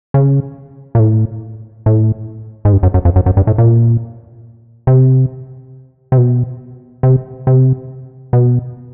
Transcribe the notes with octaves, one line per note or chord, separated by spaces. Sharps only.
C#3
A#2
A2
A2
G#2
G2
F#2
F#2
F2
F#2
F#2
G2
A2
A#2
C3
C3
B2
C3
C3
B2